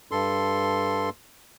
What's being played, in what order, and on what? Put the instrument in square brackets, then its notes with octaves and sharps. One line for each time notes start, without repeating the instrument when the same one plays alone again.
[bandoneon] G2 A4 C6